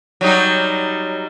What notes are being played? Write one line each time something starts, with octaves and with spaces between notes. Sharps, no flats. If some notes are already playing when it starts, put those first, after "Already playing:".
F#3 G3 D#4